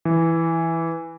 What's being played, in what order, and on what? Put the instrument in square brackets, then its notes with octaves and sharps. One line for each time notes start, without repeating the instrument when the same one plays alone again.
[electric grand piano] E3